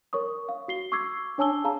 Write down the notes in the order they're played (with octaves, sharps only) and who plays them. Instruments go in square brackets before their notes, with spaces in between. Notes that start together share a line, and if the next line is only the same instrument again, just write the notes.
[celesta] A#4 C#5 C#6 D#6
F5
F#4 C7 G7
C#6 D6 E6 G#6 C7
D4 C#5 G#5 A5 E6 G7
G#4 F5 A5 A#5